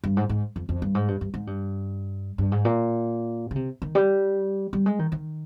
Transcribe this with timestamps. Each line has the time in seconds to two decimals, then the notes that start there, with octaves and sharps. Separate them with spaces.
0.04 G2
0.17 G#2
0.29 G#2
0.56 F2
0.69 F2
0.82 G2
0.95 G#2
1.08 G2
1.21 G2
1.34 G#2
1.47 G2
2.38 G2
2.52 G#2
2.65 A#2
3.51 C#3
3.56 C3
3.82 D#3
3.95 G3
4.73 G3
4.86 G#3
4.99 D#3
5.12 D#3